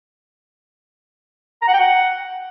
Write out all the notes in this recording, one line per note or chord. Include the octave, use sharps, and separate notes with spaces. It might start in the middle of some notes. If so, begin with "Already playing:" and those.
A#5
F#5
G5
F#5